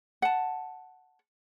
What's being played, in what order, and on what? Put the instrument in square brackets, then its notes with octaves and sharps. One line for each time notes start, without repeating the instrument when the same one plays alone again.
[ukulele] F#5 A5